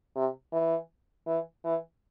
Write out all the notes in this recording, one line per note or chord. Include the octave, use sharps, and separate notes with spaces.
C3
E3
E3
E3